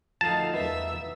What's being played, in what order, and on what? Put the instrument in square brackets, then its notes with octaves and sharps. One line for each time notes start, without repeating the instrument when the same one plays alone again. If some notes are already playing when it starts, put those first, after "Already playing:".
[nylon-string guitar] D2 F3 [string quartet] D#4 A4 F5 [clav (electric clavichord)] A5
[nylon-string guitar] E2 B4 [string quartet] E5 E6